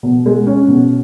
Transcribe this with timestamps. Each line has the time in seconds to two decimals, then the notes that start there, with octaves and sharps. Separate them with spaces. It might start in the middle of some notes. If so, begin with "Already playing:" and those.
0.03 B2
0.26 G#3
0.47 C#4
0.68 B2